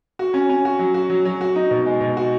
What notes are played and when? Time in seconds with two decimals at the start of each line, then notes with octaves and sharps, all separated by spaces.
0.19 F#4
0.34 C#4
0.50 C#4
0.65 F#4
0.79 F#3
0.94 F#4
1.10 F#3
1.25 F#3
1.41 F#4
1.56 D#4
1.71 B2
1.86 G#3
2.01 B2
2.17 F#4